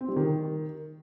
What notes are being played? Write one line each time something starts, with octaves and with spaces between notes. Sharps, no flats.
C4
G3
D#3